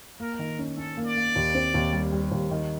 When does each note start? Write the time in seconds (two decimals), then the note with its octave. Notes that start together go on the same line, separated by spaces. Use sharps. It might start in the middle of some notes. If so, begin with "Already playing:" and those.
0.20 A#3 A#4
0.39 D#3
0.59 C#4
0.77 C#4 A4
0.97 A#3
1.06 D5
1.16 A#3
1.36 D#2
1.55 C4
1.74 D#2
1.93 G3
2.12 G3
2.31 D#2
2.51 D#3